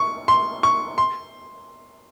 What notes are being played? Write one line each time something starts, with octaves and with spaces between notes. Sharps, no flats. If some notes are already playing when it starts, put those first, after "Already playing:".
Already playing: C#6
C6
C#6
C6